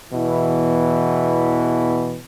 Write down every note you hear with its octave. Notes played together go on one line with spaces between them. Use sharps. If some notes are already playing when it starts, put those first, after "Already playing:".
E2 B2 E3 E4